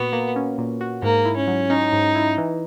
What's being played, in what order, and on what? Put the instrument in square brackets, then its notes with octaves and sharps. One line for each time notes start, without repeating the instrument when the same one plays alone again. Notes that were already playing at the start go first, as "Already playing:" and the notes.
Already playing: [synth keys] A#2 F#4 [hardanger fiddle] B3
[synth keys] A#3
C#4
A#2
F#4
[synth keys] G#2 [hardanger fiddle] A#3
[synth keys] E4
[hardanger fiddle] C#4
[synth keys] F#3
[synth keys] C#4 [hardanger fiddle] D#4
[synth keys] G#2
E4
E3